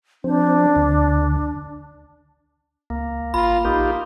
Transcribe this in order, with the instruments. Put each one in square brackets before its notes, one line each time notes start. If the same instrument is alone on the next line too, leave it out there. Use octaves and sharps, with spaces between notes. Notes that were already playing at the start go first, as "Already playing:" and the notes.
[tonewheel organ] F3 C4 C5 [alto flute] D4
[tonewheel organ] D2 D3
[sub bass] C#2 [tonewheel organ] A#3
[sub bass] G#1 [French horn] F4 [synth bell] B5
[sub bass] A#1 [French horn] A#3 [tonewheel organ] D#4 F4 G4